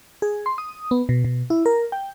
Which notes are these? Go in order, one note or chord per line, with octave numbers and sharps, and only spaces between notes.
G#4
C6
D#6
B3
B2
B2
E4
A#4
G5